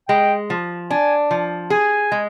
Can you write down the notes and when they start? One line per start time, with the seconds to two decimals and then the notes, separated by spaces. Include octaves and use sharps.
0.09 G#3 G5
0.50 F3
0.90 D4 G#5
1.31 F3
1.70 G#4 G#5
2.12 G#3